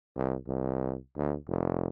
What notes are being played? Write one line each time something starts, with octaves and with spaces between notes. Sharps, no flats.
C2
C2
D2
F1